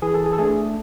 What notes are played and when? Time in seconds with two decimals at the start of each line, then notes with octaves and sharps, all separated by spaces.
0.02 E3 G#4
0.14 A4
0.26 G#4
0.33 A4
0.38 A3 D4 G#4